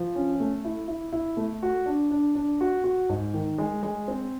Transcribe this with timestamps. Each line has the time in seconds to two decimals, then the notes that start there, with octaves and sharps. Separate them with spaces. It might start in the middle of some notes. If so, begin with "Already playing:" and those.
Already playing: F3
0.15 C#4
0.40 A3
0.65 E4
0.88 E4
1.13 E4
1.37 A3
1.63 F#4
1.86 D4
2.11 D4
2.35 D4
2.61 F#4
2.84 F#4
3.09 G#2
3.34 D#3
3.58 G#3
3.83 G#3
4.08 C4